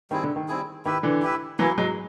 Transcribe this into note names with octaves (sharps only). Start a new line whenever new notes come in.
D#3 G3 C4 E4 G#4
D3
D#3
G3 C4 E4 G#4
D#3 E4 G4 B4 E5
D3 E3
E4 G4 B4 E5
E3 F#3 A#3 C#4 E4
F#3 G#3